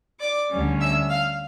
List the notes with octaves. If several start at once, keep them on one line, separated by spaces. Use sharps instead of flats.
D5 D6
D2 D3 G3 C#4
E5 E6
F5 F6